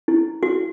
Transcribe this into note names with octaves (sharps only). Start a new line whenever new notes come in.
E4
F#4